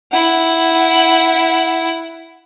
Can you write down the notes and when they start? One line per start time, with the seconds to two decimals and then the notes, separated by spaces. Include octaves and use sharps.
0.12 E4 F#5